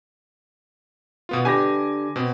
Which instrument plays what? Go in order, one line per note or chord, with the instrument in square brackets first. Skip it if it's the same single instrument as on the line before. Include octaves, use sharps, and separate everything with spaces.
[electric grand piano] B2 B3 F4
[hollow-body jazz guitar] D3 G4 B4 [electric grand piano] G#5 D6 A#6
[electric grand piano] B2 C4